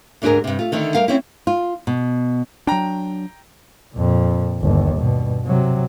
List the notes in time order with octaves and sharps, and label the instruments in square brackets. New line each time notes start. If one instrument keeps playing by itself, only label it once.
[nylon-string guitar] D2 G#2 D4 G4 G#4 A#4
G2 C3
A3 F4
D3 D#3 A3 D4
G3 A#4 F5
C4 C#4 E4
F4
B2
[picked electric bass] F#3 D4 [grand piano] G5 A#5
[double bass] F2 A#2
G1 D#2
G2 B2
C3 F#3